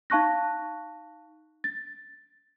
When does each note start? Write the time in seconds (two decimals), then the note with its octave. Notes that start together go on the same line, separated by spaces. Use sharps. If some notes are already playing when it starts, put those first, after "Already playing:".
0.10 D#4 F5 A5 C#6 F#6 A#6
1.64 A6